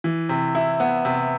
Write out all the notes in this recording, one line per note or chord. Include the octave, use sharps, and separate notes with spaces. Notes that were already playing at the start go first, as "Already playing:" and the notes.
E3
C3
E4
B3
C3